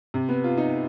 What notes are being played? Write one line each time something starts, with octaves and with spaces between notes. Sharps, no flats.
C3
B3
F4
D#4